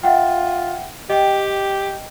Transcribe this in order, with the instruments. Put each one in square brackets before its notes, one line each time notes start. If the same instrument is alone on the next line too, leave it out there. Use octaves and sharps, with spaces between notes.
[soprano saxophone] F4 [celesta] E5 F#5 G5
[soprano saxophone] G4 [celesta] D#5 G5